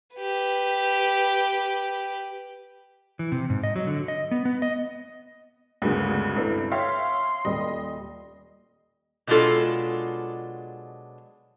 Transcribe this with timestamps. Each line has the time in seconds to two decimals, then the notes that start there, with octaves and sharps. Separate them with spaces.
0.16 G4 B4
3.19 E3
3.32 C3
3.50 G#2
3.64 D#5
3.76 F#3
3.87 D3
4.08 D#5
4.31 B3
4.45 B3
4.62 D#5
5.82 D2 G2 C#3 G#3 A#3 B3
6.36 G1 G2 C3 E4 A4 B4
6.72 C#5 E5 F5 G5 C6
7.45 D#1 G3 D#5
9.27 B2 F#3 G#3 D4 F4 A4